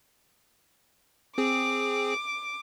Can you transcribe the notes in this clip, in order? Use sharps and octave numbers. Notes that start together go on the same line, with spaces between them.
C4 G#4 D6